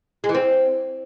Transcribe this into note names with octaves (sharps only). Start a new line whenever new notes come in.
G#3
E3
C4